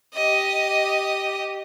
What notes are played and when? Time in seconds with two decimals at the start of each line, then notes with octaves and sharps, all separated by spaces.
0.14 G4 D#5